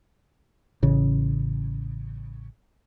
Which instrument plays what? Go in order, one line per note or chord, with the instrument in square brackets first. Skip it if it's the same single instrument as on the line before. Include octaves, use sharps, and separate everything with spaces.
[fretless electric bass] A1 C#3